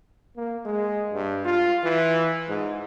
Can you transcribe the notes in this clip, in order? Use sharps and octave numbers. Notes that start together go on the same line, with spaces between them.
A#3
G#3
G2
F4
E3
G#2